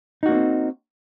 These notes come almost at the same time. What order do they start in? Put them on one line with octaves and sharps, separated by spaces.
D#4 F#4 A#3 D4 C4